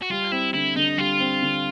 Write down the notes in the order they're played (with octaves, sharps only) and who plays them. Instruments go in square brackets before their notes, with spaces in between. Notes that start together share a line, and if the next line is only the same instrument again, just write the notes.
[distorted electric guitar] F#4
[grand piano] G3 [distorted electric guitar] F4
[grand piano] C4 [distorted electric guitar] E4
[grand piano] D3 [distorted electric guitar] E4
[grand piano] D3 [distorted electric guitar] D#4
[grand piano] G3 [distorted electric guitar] F4
[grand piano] C4
D3